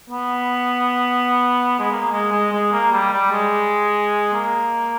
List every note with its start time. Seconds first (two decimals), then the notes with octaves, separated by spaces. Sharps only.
0.10 B3
1.80 G#3
1.91 A#3
2.12 G#3
2.32 G#3
2.52 G#3
2.72 A#3
2.92 G3
3.12 G3
3.32 G#3
4.33 A#3